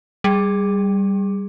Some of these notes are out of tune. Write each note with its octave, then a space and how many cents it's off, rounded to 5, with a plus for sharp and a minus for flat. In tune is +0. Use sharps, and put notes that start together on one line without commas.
G3 +0 G#4 -15